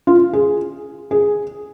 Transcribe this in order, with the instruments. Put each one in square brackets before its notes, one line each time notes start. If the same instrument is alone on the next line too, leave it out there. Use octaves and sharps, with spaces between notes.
[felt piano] F4
G#4
G#4